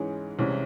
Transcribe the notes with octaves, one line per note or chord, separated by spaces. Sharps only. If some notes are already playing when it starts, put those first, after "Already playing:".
Already playing: G#2 E3 G#3 C#4
C2 C3 E3 G#3 C#4